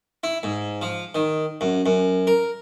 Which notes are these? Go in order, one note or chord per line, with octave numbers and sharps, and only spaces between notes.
E4
G#2
F3
D#3
F#2
F#2
A#4